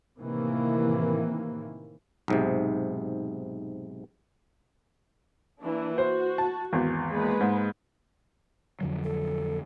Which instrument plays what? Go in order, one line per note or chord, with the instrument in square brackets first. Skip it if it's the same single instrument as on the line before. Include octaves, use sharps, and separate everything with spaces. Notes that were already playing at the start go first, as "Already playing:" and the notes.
[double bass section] A2 C3 D#3 E3 A#3
[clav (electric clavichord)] B1 G#2 C3
[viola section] E3 A#3 D4
[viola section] F#4 [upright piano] C5
[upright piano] A5
G#1 E2
[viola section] G#3 A#3 B4
[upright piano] G#2
[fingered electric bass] F2 D3 F#3
[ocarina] A4